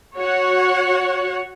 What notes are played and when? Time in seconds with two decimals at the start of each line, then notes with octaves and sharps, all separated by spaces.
0.16 F#4 C#5 F#5